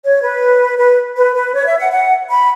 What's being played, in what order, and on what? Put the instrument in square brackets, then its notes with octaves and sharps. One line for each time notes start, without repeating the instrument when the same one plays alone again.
[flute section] C#5
B4
B4
B4
B4
C#5
E5
F#5
F#5
B5